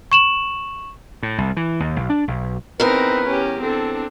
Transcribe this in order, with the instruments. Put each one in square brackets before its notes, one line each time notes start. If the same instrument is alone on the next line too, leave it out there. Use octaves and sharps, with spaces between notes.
[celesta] C#6 E7 F#7
[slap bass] A2
C2
E3
D#2
B1
D4
B1
[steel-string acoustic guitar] E2 A#4 [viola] C4 D#4 [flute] B4
[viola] C#4 G4
[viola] C4 D4 [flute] A4